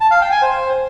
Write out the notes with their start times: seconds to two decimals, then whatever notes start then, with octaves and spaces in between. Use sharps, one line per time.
0.01 A5
0.11 F5
0.21 G5
0.32 G#5
0.42 C5